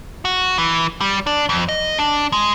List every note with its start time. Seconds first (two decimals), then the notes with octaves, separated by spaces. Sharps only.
0.25 F#4
0.58 E3
1.01 G3
1.27 D4
1.49 F2
1.69 D#5
1.98 D4
2.32 G#3